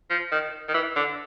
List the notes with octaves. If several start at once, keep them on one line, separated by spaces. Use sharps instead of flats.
F3
D#3
D#3
E3
D3